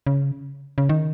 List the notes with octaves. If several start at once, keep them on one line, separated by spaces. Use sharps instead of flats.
C#3
C#3
D#3